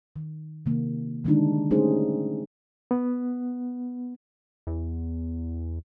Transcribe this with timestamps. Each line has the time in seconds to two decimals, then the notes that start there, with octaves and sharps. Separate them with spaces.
0.16 D#3
0.66 C3 D#3 A#3
1.24 D3 D#3 G3 G#3 D4 D#4
1.71 G3 A3 C#4 D#4 G#4 C5
2.91 B3
4.67 E2